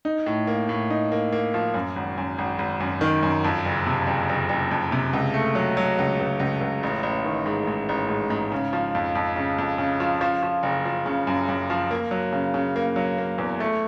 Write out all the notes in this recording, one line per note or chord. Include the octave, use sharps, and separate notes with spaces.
D#4
A2
A#3
A2
D#4
A#3
A#3
F3
F#2
G#1
F#2
G#1
G#1
F#2
D#3
F#2
F2
F#1
C3
F#1
F#1
F#1
F2
C3
C#2
A3
F#3
F#3
C#2
C#2
C#2
C#2
A1
A1
D#3
G#2
G#2
A1
G#2
G#2
C#3
F3
F2
F2
C#3
F2
C#3
F3
F3
F3
F#1
F3
C#3
F#2
F#2
F3
A#3
F#3
C#3
C#3
A#3
F#3
A#3
E2
A3